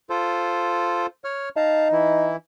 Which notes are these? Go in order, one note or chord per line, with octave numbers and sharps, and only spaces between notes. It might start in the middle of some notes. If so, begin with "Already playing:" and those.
F4 A4 C5
C#5 F6
D#4 F5 A5 A#5
E3 E4